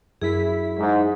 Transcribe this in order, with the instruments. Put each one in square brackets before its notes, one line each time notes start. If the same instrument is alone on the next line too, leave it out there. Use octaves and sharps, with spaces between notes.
[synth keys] F#2 E4 B6 [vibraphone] G#4
[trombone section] G#2